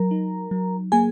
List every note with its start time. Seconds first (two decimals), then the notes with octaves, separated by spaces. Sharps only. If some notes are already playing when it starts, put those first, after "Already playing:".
Already playing: F#3 A#4 A#5
0.11 D#4
0.51 F#3
0.92 A#3 G#4 G#5